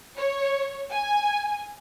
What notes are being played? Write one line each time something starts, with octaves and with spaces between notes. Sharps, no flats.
C#5
G#5